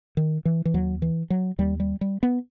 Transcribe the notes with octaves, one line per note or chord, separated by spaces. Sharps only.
D#3
E3
E3
D#2 F#3
E3
F#3
D#2 G3
G3
G3
B3